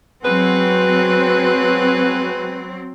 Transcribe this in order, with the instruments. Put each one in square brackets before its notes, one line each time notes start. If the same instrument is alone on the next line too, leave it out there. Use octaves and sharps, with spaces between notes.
[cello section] F#3 C4 [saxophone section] G#3 B3 B4